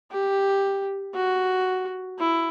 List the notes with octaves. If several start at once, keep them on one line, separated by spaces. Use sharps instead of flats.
G4
F#4
E4